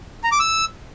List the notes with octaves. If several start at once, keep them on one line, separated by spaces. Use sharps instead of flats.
A#5
D6
E6